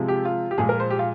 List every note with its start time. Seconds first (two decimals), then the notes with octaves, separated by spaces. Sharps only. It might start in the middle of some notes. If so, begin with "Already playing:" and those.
Already playing: C3 F3 G#3
0.08 G4
0.25 F4
0.51 G4
0.58 A#2 F3 G#3 G#4
0.69 A#4
0.80 C5
0.90 G4
0.99 F4